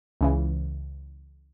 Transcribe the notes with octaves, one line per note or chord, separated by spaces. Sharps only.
C#2 C#3 E3